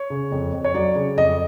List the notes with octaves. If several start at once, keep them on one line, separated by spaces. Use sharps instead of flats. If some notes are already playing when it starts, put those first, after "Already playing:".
Already playing: C#5
C#3
F2
F2
C#5
F#3 D5
C#3
F2 D#5